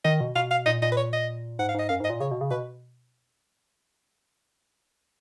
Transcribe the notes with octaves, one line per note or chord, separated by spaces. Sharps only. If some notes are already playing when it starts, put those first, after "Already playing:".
D#3 D#5
B2
B2 F5
F5
A#2 D#5
A#2 D#5
B4
C#5
D#5
G#2 F#5
F5
G#2 D#5
F#2 F5
G#2 D#5
A#2
C#3 C#5
B2
C#3
B2 B4